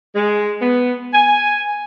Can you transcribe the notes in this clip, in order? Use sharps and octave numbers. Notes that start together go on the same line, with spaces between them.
G#3
B3
G#5